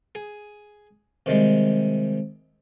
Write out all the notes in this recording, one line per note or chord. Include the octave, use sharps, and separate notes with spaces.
G#4
C3 D#3 G3 G#3